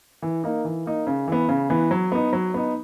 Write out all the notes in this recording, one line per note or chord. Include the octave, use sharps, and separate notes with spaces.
E3
A#3 D#4
E3
A#3 D#4
C#3
E3 B3
C#3
E3 B3
F#3
B3 D#4
F#3
B3 D#4